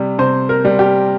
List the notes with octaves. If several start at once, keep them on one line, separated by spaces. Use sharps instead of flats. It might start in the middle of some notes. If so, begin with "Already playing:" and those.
Already playing: C3 G3
C3 C5
A#4
G3
G4